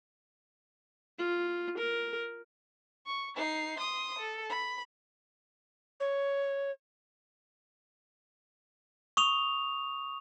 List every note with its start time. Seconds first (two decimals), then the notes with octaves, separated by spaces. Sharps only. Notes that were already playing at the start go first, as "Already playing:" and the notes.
1.18 F4
1.77 A#4
3.06 C#6
3.36 D#4 C7
3.79 C6 D#6
4.18 A4
4.49 B5
6.00 C#5
9.17 C#6 D#6 F7